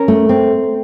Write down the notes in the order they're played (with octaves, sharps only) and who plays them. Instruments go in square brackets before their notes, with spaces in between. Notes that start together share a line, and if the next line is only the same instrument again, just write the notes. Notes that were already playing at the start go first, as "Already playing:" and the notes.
Already playing: [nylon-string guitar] C#4 A#4
A3
C4